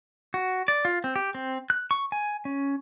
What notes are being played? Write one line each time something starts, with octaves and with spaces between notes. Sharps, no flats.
F#4
D5
F4
C4
G4
C4
F#6
C#6
G#5
C#4